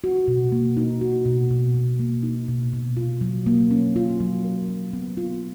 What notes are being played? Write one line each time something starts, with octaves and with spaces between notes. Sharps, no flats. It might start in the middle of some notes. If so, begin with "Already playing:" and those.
F#4
B2
A#3
D#4
F#4
B2
B2
B2
A#3
D#4
B2
B2
F4
F#3
A#3
C#4
F4
F#3
A#4
F#3
B3
F4